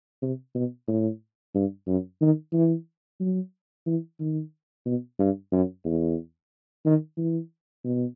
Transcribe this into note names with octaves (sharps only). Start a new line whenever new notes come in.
C3
B2
A2
G2
F#2
D#3
E3
F#3
E3
D#3
B2
G2
F#2
E2
D#3
E3
B2